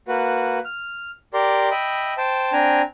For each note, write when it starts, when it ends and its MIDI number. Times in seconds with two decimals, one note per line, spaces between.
0.08 0.59 58
0.08 0.59 66
0.08 0.59 71
0.65 1.11 89
1.34 1.69 67
1.34 1.69 70
1.34 1.69 74
1.34 1.69 84
1.71 2.14 75
1.71 2.14 76
1.71 2.14 79
1.71 2.14 83
2.18 2.52 72
2.18 2.52 79
2.18 2.52 81
2.53 2.82 60
2.53 2.82 62
2.53 2.82 79
2.53 2.82 80
2.53 2.82 82